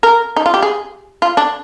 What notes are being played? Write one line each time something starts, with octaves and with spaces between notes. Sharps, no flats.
A#4
D#4
F4
G4
G#4
F4
D4